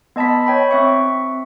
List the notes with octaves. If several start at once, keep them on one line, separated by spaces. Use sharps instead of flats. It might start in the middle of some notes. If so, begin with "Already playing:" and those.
B3 D#5 A5 B5 B6
C#5 G5 B5
C4 E5 C#6